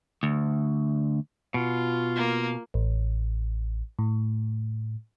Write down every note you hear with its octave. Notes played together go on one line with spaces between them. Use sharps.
D2
B2 F4
A#3
A1
A2